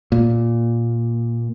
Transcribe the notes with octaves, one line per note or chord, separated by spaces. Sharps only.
A#2